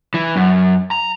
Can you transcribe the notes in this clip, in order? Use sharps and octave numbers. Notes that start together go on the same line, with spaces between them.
E3
F#2
A#5